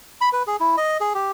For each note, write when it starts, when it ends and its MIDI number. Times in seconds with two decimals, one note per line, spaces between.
0.21 0.29 83
0.33 0.43 71
0.47 0.56 68
0.60 0.76 64
0.77 0.97 75
1.00 1.13 68
1.15 1.31 67